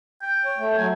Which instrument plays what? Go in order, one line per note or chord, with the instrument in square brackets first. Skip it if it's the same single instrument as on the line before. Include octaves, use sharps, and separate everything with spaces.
[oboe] G5
[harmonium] C#5
A3
[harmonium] F#3 A3 [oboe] G#5